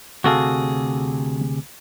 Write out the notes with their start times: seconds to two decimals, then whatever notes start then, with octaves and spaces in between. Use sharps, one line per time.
0.24 D2 C3 F#4 G#4 A4 F5